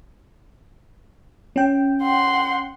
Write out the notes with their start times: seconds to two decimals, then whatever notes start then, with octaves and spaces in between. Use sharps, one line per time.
1.56 C#4 G5
2.03 F#5 C6